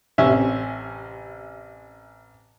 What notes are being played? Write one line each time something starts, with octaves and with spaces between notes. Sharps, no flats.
A1 C3 C#4 E5